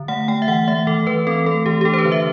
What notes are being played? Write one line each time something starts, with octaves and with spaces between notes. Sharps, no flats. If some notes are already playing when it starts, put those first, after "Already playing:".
Already playing: D3
A3 F#5
A3 G5
E5
E3 F#5
A3 E5
E3 A4
E3 B4
C4 A4
A3 A4
E3 G4
G4
D4 A4
C5
B4
D3
E5